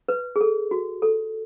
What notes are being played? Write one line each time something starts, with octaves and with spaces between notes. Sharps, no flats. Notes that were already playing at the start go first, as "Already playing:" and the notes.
B4
G#4
A4
F#4
A4